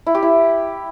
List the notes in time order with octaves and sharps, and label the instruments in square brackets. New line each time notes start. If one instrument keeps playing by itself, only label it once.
[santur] E4
G4
E4